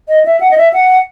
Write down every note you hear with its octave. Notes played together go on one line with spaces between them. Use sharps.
D#5
E5
F#5
D#5
E5
F#5